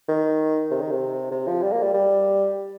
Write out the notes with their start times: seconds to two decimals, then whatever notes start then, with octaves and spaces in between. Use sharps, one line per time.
0.09 D#3
0.71 C3
0.81 D#3
0.91 C3
1.32 C3
1.48 F3
1.63 G3
1.73 A#3
1.83 G3
1.94 G3